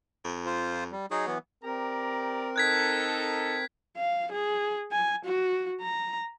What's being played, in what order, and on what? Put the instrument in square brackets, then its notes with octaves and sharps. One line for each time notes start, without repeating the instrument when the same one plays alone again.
[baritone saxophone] F2
[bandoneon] F4 C5
G3
[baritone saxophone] F#3 [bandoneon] D#4 G#4
[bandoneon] E3 B3
[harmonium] C4 A#4 [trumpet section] G4 D5 A#5
[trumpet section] D#4 A4 [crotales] F#6 G#6 B6
[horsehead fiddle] F5
G#4
G#5
F#4
A#5